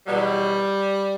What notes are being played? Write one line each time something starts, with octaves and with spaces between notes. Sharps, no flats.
E2 B2 F#3 G3